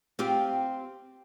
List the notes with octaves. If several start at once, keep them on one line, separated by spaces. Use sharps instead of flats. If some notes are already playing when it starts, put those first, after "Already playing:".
C4 F4 G4